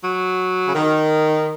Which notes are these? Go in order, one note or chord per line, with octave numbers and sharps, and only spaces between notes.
F#3
C#3
D#3